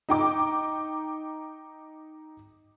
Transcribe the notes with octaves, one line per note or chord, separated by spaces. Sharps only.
D#4 G5 D6